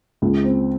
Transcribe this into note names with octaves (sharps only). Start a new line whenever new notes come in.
C#2
C4